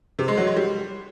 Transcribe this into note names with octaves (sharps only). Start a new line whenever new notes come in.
C3
G#3
F#3
G#3
G3